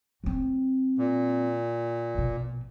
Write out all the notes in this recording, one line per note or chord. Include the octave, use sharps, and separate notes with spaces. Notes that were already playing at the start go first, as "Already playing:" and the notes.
F#3 C4
A#2
A#1 B2